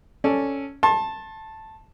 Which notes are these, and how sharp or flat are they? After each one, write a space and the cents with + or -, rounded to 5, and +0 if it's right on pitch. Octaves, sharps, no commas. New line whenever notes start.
C#4 +0 A4 +0 D5 +0
A5 +0 C6 +40